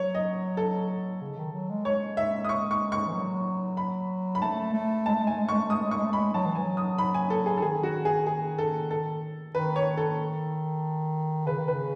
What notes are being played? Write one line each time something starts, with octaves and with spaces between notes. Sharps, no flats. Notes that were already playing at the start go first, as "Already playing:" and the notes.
Already playing: F#3 C#5
D#5
A4
C#3
D#3
F#3
G#3
G#3 C#5
E5
D#6
C#6
C#6
C#6
E3
F#3
B5
B5
A3 A5
A3
G#3 A5
A3
G#3
A3 G#5
G#3
A3
G#3 C#6
A3
G#3
A3 D#6
G#3
A3 C#6
G#3
A3
G#3 B5
F#3 A5
E3
F#3 G#5
D#6
B5
G#5
A4
G#4
A4
D#3 G#4
F#4
G#4
G#4
A4
A4
D#3 B4
C#5
A4
C#3 B4
D#3
C#3 B4